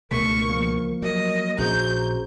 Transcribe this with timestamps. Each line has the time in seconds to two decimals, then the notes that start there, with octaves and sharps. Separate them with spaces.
0.11 C#2 B2 D3 A3 A#4 C#6 B6
0.50 F3 A#3
1.02 F#3 A#4 D#5
1.58 A#1 C#4 F#4 G#4 C5 A#5 G6